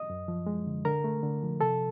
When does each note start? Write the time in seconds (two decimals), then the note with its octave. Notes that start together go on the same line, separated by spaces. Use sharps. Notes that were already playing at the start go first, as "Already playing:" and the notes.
Already playing: D#5 D#6
0.10 F#2
0.28 F3
0.46 G#3
0.66 D3
0.85 D3 A#4 A#5
1.04 A3
1.23 D3
1.43 F3
1.61 C3 A4 A5